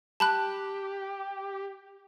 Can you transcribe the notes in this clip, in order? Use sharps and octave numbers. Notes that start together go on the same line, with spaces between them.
G4 A5 B5 F#6